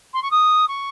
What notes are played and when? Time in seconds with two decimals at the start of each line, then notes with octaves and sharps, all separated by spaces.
0.13 C6
0.22 C#6
0.31 D#6
0.68 C#6